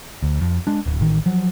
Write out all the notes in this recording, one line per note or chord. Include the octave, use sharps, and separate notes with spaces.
D2
F2
G#3 D4
D1
A1 D#3
F3 F#3